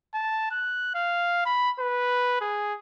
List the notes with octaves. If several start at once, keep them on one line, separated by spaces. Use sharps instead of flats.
A5
F#6
F5
B5
B4
G#4